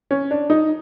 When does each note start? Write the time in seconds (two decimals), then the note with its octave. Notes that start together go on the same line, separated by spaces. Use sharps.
0.11 C#4
0.31 D4
0.50 D#4